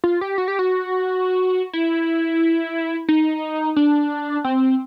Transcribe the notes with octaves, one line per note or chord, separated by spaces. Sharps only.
F4
G4
F#4
G4
F#4
E4
D#4
D4
C4